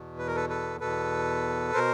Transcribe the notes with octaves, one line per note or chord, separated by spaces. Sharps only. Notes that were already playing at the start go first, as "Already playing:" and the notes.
Already playing: E2 B2
B4
A#4
A4 B4
A4 B4
E2 B2 A4 B4
B2 A#4 C5